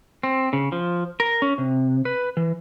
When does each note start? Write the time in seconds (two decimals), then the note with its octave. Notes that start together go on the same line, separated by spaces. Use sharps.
0.23 C4
0.53 C#3
0.72 F3
1.20 A#4
1.42 C#4
1.58 C3
2.05 B4
2.37 E3